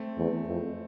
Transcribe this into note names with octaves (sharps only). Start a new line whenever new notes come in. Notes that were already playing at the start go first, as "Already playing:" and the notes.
Already playing: A3 C4
E2
F2